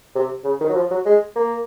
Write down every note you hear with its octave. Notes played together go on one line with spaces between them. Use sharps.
C3
C#3
D#3
F#3
F3
F#3
G#3
A#3